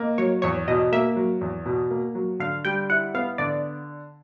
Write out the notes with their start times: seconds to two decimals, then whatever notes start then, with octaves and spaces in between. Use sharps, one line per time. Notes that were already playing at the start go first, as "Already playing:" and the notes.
Already playing: A#3 D#5
0.18 F#3 C#5
0.42 E2 C#5
0.67 B2 D#5
0.92 A#3 E5
1.16 F#3
1.41 E2
1.66 B2
1.90 A#3
2.15 F#3
2.40 D3 F5
2.65 G3 G5
2.90 E4 F#5
3.14 B3 F5
3.38 D3 D5